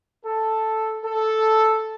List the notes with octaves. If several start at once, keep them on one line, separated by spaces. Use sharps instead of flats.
A4
A4